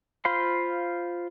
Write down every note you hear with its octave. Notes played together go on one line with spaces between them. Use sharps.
F4 C5 F5 B5 C6